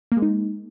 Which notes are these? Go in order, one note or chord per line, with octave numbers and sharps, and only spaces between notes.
A#3
G#3
D#4